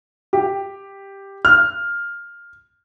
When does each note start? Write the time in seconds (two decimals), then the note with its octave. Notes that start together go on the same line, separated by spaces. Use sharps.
0.33 G4
1.45 F6